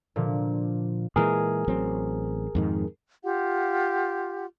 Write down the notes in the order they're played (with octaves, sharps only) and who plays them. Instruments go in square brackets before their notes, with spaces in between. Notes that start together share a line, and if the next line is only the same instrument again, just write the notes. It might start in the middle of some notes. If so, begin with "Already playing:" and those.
[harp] A#2 D3 F3
[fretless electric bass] A#2 E3 G#3 [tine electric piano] G#4 A#4
[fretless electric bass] A1 F#3 C4
F2 G#2 D#3
[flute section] F4 G4 F#5